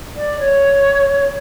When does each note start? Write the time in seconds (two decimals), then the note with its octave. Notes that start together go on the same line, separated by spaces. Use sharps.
0.16 D5
0.39 C#5